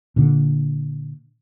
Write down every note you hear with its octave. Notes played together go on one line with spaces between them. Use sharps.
A#2 D3